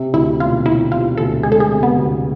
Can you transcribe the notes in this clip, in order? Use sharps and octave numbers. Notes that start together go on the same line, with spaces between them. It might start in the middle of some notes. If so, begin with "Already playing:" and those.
Already playing: C3
D2 E4
E1 F4
E3 E4
C3 F4
D2 A4
G#3 G#4
A4
G#4
C3
B3
D2